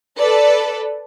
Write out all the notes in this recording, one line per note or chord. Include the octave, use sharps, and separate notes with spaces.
A4 B4 D5